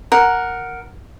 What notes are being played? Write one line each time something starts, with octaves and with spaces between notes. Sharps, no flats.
A#4 F#5